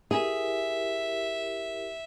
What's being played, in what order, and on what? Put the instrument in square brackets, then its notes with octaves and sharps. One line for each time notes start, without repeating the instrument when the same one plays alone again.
[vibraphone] E4 G4 A#4 [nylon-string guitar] G#4 [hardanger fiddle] E5